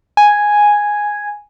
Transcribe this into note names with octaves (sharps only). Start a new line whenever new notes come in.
G#5